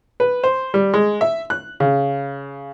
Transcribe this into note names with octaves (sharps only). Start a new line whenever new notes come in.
B4
C5
G3
G#3
E5
F#6
C#3